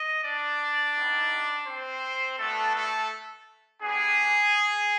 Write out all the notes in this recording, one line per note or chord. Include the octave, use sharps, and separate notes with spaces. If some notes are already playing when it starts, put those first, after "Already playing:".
Already playing: D#5
D4 D5
G3 B3 D#4 G4
C4 C5
A3 B3 D4 F#4 A4
A3 A4
B3 D4 G4 G#4